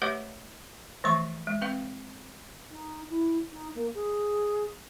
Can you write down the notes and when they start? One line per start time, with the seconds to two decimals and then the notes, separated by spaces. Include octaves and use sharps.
0.02 A3 G4 B4 C#5 D#5 F#5
1.04 E3 F3 A3 C#6
1.47 G#3
1.61 C4 B4 F5
2.71 D#4
3.10 E4
3.52 D#4
3.75 A#3
3.94 G#4